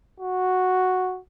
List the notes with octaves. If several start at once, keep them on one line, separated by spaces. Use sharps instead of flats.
F#4